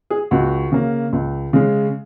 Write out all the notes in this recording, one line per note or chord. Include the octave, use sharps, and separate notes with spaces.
G#4
C#2 F#4
C#3 A#3
C#2
C#3 G#3